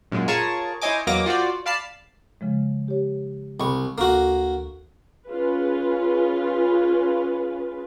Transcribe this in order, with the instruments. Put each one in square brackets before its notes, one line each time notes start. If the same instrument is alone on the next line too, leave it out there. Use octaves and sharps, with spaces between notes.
[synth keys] F#2 A#2 G#3
F4 G#4 A#4 C#5 A5 C#6
E4 C5 C#5 D#5 G#5 D6
E2 F#3 A#3 D#5 D6 A#6
F4 F#4 C5 D5
D5 F5 A5 B5 C7
[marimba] C#3 F3 G#3
G4 C#5
[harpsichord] C2 C#6 [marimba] B5
[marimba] D2 A4 [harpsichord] A#3 F#4
[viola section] C#4 F4 G#4 B4